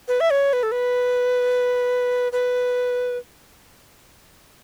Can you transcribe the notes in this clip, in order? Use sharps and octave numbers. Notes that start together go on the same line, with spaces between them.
B4
E5
C#5
B4
A4
B4
B4